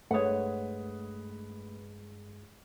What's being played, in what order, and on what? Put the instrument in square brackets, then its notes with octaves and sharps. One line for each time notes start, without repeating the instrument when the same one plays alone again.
[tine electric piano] G2 G#3 [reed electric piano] A3 [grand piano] B4 D#6 [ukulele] C#5 F#5